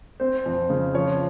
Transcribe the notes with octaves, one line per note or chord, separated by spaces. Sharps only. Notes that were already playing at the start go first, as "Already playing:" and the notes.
C4 C5
F2
C#3
F3 C#5